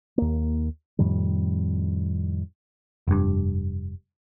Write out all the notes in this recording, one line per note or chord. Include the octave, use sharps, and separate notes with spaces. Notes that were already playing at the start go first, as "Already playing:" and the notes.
D#2 A#3
F2 A2 D#3 G3
F1 G2